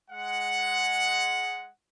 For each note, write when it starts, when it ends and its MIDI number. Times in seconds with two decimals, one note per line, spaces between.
0.11 1.69 56
0.11 1.69 78